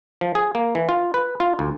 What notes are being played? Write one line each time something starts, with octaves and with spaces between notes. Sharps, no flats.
F3
G#4
A#3
E3
F4
B4
F4
D2